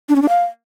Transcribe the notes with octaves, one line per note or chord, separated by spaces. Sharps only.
D4
C#4
D4
F5